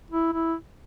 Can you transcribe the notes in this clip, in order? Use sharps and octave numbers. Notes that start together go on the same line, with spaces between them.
E4
E4